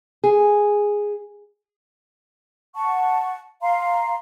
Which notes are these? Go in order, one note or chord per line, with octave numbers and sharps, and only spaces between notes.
G#4
F#5 A5 C#6
F5 A#5 C6